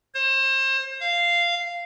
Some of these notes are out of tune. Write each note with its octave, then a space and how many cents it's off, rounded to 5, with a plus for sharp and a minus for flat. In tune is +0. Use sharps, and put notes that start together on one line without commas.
C5 +35
F5 -10